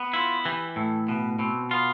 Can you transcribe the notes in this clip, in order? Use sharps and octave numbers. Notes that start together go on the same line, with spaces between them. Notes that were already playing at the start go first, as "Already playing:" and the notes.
Already playing: B3
E4 F4
E3 G4
A2 A4
B2 B4
B2 C4
B3 F4